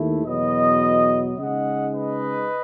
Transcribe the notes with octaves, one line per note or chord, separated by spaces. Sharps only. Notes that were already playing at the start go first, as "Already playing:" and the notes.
Already playing: D#2 D#3 A3 E4
E2 B2 F#3 B4 D#5
C#3 G#3 D#4 D#5 F#5
B4 D#5